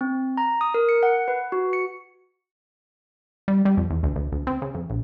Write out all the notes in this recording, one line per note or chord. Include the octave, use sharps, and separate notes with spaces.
C4
A#5
D#6
A#4
C#7
F#5
B4
F#4
C#7
G3
G3
F2
E2
D2
D2
D2
C4
C#3
F2
A#1